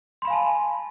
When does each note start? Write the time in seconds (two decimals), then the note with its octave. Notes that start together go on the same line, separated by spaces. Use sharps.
0.22 C6
0.25 B5
0.27 F5
0.30 G#5
0.33 A5